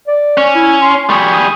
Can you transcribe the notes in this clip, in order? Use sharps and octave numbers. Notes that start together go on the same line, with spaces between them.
D5
C#4
E4
C6
G3 G#4 C#6
D#6